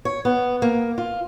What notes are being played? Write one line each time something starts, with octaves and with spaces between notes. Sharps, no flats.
C#5
B3
A#3
F4